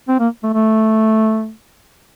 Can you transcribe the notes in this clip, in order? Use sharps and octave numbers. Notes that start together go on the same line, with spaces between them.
C4
A#3
A3
A3